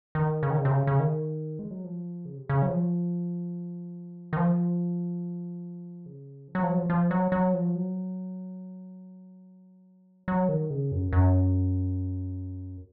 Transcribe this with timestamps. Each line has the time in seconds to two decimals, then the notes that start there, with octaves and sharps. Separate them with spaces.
0.15 D#3
0.43 C#3
0.50 D#3
0.58 C#3
0.65 C3
0.70 C#3
0.87 C#3
1.00 D#3
1.59 G#3
1.71 F#3
1.84 F3
2.25 C#3
2.37 C3
2.49 C#3
2.62 F#3
2.68 F3
4.33 D#3
4.37 F3
6.06 C#3
6.48 F3
6.55 F#3
6.63 F3
6.70 F#3
6.78 F3
6.90 F3
7.11 F#3
7.32 F#3
7.54 F3
7.75 F#3
10.28 F#3
10.49 D#3
10.70 C#3
10.92 F#2
11.13 F#2